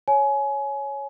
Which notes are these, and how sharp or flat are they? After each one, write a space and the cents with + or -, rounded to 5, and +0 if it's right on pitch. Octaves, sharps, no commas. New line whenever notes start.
C#5 +0 G#5 +25